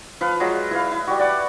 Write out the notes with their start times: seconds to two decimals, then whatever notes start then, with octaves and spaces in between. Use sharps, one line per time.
0.21 F3 B4 F5
0.40 F#3 G#3 F4
0.71 E4 B4 F5
0.91 E4
1.07 G3 F#4
1.19 D5 F#5